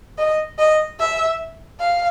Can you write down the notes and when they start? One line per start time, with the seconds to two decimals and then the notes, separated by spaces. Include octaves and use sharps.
0.18 D#5
0.58 D#5
0.99 E5
1.80 F5